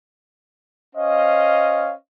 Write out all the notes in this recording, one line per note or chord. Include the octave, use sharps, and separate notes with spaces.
C#4 C5 D#5 F5